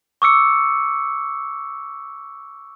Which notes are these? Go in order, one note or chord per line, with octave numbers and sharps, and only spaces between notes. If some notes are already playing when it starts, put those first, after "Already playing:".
C#6 D6 E6 C#7